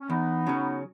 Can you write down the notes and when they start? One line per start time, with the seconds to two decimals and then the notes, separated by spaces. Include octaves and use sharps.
0.01 C#4
0.10 E2 B3 D#4
0.46 C#3 F#3 C#4